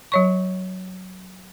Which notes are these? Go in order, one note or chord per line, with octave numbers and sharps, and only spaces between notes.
F#3 C#5 C#6